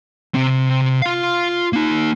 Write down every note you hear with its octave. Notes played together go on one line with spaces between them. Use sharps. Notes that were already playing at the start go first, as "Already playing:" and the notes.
C3 C4
F4 F5
A#3 D#4